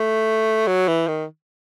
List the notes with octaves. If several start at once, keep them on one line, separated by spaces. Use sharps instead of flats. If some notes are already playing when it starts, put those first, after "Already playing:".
Already playing: A3
F#3
E3
D#3